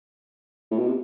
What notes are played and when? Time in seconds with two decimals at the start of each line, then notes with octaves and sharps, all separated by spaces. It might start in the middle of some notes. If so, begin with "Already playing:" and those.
0.71 A2
0.79 B2
0.87 C3